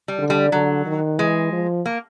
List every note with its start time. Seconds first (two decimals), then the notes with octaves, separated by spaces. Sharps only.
0.08 G3
0.18 D3
0.30 G3
0.52 D3 F#3
0.86 D#3
1.18 E3 G#3
1.52 F3
1.86 A#3